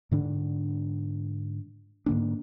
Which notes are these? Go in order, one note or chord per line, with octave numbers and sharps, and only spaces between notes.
G#2 D3 D4
G#2 D3 A#3 D4